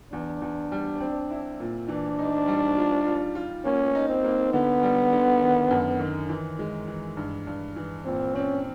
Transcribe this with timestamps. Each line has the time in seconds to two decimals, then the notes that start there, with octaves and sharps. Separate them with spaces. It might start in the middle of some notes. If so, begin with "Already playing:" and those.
0.13 E2 D4
0.42 E2
0.72 G3
1.00 C4
1.31 E4
1.60 A#2
1.88 E3 D4
2.19 D#4
2.48 G3
2.77 F4
3.06 F4
3.35 F4
3.65 A#3 C#4
3.95 D#4
4.09 C4
4.24 A#3
4.53 D3 B3
4.83 G3
5.12 D3
5.42 D#3
5.71 F#2
5.99 D#3
6.29 E3
6.59 G#3
6.87 E3
7.17 G2
7.47 G2
7.76 E3
8.05 A#2 C4
8.35 C4 C#4